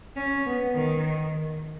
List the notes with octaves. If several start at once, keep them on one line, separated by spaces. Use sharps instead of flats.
C#4
B3
D#3